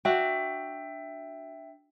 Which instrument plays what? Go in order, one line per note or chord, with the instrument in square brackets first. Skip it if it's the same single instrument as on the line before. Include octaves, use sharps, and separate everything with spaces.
[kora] D4 F#4 [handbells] E5 G5